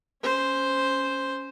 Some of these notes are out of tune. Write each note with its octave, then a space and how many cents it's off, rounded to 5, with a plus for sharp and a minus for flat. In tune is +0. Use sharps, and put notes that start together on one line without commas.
C#4 +0 C5 +0